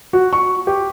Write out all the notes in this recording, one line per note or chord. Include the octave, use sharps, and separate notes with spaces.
F#4
C#6
G4